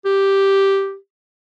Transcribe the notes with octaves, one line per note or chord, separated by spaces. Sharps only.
G4